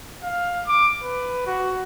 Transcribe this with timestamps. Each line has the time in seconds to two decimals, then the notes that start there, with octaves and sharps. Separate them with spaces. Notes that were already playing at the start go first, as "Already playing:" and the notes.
0.23 F5
0.67 D6
1.02 B4
1.46 F#4